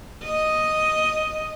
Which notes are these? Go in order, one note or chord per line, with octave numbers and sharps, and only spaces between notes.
D#5